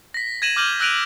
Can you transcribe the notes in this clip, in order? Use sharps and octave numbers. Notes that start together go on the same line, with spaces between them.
A#6 B6
G#6 A#6 D#7 E7 F#7
D6 F6 G6 D#7 F#7
E6 F#6 A#6 D7 D#7 F7